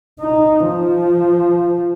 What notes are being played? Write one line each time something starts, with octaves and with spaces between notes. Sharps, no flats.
D#4
F3